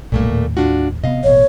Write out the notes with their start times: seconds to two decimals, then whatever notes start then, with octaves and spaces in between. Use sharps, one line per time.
0.12 B1 G2 A#2 A3 A#3
0.28 D#2 A2
0.57 D4 F4 F#4
1.04 C3 B3 D#5 F5
1.24 A1 B2 C#5